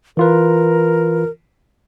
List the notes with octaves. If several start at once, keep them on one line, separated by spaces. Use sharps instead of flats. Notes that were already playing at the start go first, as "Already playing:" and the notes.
E3 F4 A#4 B4